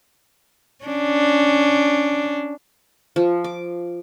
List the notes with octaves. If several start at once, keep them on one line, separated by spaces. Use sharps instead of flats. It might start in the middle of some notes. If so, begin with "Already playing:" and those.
C#4 D4
F3
D6